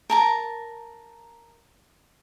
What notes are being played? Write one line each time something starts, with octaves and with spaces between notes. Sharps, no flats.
A#4 A5 A#5